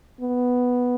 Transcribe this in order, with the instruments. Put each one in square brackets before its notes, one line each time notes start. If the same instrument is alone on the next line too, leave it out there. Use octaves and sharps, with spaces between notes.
[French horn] B3